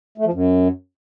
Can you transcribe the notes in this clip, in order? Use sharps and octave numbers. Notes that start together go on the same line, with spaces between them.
A3
F3
F#2